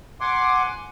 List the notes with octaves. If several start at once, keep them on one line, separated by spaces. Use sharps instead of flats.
F#5 G#5 C6 D6